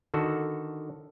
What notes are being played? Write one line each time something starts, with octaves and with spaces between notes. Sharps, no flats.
D3 D#3 F#4 A4